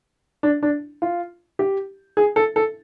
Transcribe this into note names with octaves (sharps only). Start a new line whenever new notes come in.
D4
D4
F4
G4
G#4
A4
A4